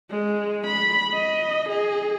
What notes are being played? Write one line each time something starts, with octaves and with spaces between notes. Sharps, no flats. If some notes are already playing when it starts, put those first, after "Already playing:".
G#3
B5
D#5
G#4